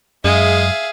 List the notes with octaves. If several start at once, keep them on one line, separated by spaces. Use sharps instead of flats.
F#2 G#3 G#4 E5 F5